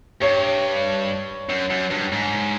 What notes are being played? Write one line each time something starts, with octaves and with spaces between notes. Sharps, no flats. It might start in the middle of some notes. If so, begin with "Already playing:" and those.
G2 C#5
F#2
F#2
G2
G#2